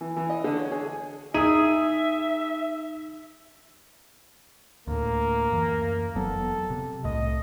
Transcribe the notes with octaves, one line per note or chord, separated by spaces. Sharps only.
E3
E3
D#5
D3
C#5
G#4
D#4 G#4 E5 D#6 D#7
D2 A2 A#3
F#2 E3
F1 F#3 B3 A4
C3
C2 A2 D#5